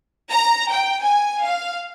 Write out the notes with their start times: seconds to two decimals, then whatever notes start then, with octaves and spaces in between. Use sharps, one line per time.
0.30 A#5
0.70 G5
1.01 G#5
1.43 F5